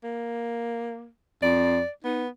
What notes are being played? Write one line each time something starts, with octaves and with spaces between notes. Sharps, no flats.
A#3
F2 D5
B3 D#4